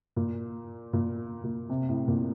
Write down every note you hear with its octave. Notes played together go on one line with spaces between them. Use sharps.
A#2
A#2
A#2
C3
A2
A#2